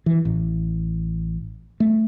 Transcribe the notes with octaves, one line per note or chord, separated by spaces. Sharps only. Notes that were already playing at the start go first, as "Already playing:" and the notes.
E3
A1
A3